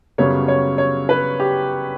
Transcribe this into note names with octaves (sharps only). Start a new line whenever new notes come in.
F#2 C#3 G3 B3 C#5
C#5
C#5
B4
G4